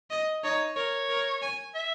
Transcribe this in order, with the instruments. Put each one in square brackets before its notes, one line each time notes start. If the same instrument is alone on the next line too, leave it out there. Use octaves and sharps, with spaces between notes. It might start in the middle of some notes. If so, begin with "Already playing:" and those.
[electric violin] D#5
[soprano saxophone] D#4 [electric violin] C#5
[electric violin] A#4 [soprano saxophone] C#5
[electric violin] A#4
G#5
[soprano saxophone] E5